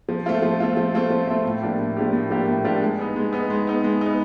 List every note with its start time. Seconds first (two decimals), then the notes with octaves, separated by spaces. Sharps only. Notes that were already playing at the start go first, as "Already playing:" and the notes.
0.09 F3
0.26 A3 C4 F4
0.42 F3
0.60 A3 C4 F4
0.77 F3
0.94 A3 C4 F4
1.10 F3
1.27 A3 C4 F4
1.45 A2
1.62 F3 A#3 D4 G4
1.79 A2
1.97 F3 A#3 D4 G4
2.13 A2
2.30 F3 A#3 D4 G4
2.48 A2
2.64 F3 A#3 D4 G4
2.81 G#3
2.99 B3 D#4
3.16 G#3
3.33 B3 D#4
3.50 G#3
3.67 B3 D#4
3.84 G#3
4.01 B3 D#4